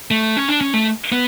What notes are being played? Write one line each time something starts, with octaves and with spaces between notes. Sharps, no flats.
A3
C#4
D4
C#4
A3
B3